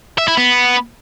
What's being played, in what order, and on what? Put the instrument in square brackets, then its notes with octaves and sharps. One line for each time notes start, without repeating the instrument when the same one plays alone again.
[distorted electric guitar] E5
E4
B3